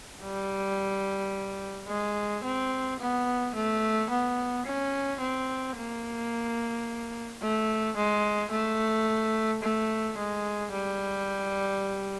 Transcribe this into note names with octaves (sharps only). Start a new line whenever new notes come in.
G3
G#3
C4
B3
A3
B3
C#4
C4
A#3
A3
G#3
A3
A3
G#3
G3